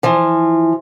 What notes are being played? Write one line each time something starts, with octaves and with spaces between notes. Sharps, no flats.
E3 F3